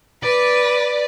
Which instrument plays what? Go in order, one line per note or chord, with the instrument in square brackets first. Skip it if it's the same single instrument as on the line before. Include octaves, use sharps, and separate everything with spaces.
[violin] B4 [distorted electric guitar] D5